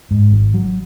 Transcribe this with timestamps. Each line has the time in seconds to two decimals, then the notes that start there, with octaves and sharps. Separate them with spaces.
0.11 G#2
0.32 G#1
0.54 F#3